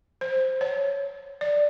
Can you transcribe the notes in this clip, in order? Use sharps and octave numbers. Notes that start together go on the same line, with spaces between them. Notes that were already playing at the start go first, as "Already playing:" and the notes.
C5
C#5
D5